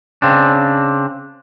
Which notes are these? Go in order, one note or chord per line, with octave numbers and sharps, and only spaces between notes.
C#3 C4 D4